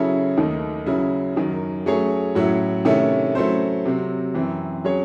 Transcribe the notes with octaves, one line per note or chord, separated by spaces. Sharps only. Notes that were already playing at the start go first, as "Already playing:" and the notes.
Already playing: C#3 F#3 C#4 E4 A4
D#2 D#3 A3 D#4
C#3 F#3 C#4 E4
F#2 D#3 F#3
F#3 A3 C#4 G#4 C#5
A2 F#3 C#4 E4
C3 D#3 A3 C#4 E4
F#3 A3 C#4 E4 C5
C3 F#3 C4
F#2 E3 C4
F#3 C#4 G#4 C#5